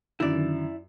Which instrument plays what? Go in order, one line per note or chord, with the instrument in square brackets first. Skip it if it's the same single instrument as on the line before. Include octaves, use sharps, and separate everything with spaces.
[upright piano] F#2 [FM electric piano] D3 D#3 F#3 [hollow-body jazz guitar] E4 D5